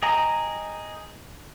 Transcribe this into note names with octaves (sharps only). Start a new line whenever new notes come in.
G#4 D#5 G5 G#5 A#5